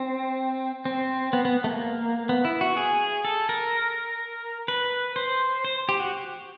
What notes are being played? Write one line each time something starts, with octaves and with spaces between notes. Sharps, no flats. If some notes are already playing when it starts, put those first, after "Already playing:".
Already playing: C4
C4
B3
B3
A3
A#3
B3
E4
F#4
G#4
A4
A#4
B4
C5
C5
G4
F#4